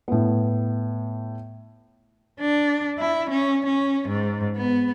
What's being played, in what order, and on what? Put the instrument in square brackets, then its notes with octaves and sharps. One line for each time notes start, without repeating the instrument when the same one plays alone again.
[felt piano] A2 B3
[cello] D4
E4
C#4
C#4
G#2
B3